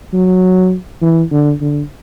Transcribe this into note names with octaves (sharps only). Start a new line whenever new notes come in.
F#3
E3
D3
D3